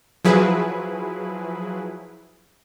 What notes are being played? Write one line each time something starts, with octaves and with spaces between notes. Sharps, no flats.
F3 F#3 E4 G#4 B4